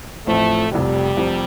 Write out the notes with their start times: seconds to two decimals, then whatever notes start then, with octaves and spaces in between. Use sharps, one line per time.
0.27 A1 A2 F3 A3 C4 F4
0.72 F1 F2 C3 G3
1.17 F1 F2 C3